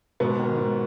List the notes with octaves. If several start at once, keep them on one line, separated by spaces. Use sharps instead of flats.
G#2 B2 B3
D#3
G#2